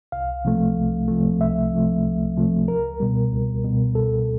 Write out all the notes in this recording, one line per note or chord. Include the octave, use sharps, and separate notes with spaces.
C2 F5
C3 F3 A3
C2
C3 F3 A3
C2 E5
C3 F3 A3
C2
C3 F3 A3
C#2 A#4
B2 G3
C#2
B2 G3
C#2 A4